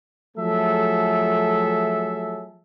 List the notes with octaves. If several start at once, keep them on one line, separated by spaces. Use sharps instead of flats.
F3 F#3 A3 G#4 A4 E5